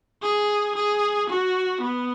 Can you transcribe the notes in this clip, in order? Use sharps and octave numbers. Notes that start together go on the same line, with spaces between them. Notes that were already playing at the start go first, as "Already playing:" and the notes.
G#4
G#4
F#4
B3